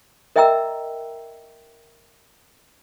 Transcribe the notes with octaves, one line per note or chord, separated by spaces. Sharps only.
A#4 D#5 E5 G5 A#5 E6